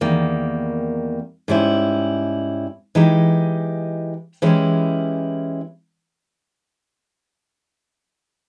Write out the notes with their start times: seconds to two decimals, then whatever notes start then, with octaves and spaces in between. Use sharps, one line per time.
0.01 E2 D#3 G3 A#3
1.48 G#2 G3 C#4 E4
2.95 E3 G#3 D#4 G4
4.42 E3 G#3 C#4 E4 G4